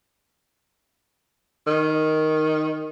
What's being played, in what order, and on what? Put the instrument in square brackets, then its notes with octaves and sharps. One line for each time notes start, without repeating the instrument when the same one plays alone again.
[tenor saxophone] D#3